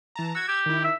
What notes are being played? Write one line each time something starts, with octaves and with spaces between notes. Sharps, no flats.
E3 A5 A#5
F#4 E6 G#6
G4
D#3 E4
E5